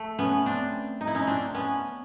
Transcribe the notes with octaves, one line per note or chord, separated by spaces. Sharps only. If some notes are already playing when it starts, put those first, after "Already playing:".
Already playing: A3
B3 C#4
C4 D4
D#4
E4
C#4 D#4
C4 D4
B3 C#4